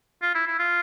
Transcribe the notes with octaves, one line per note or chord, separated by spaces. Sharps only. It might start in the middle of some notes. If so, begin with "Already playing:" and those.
F4
E4
E4
F4